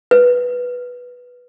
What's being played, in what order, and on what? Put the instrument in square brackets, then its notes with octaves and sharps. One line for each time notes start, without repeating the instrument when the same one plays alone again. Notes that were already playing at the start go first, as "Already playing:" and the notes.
[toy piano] B4